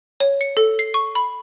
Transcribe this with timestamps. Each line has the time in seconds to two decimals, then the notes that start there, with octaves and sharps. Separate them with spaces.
0.20 C#5
0.41 C#7
0.57 A4
0.79 C7
0.94 C#6
1.15 B5